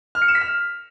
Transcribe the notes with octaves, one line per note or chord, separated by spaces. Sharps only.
F6
C#7
E7
B6
F6